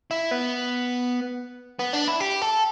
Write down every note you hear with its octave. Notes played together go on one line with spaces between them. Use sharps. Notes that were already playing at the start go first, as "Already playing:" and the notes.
E4
B3
B3
D4
E4
G4
A4